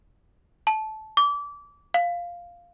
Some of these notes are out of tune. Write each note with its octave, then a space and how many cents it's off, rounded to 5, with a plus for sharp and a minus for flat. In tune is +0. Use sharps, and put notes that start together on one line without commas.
A5 -15
D6 -25
F5 +0